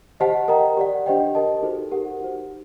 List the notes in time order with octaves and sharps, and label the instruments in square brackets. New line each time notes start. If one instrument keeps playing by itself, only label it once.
[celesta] G4 C5 D#5 F#5 A5
A#4 D#5 G5 A#5
G4 D5 F#5
D4 G4 C5 D#5 G5
G4 A#4 D#5 A5
D#4 F#4 A4 C5
G4 A#4 F#5
D#4 F#4 C5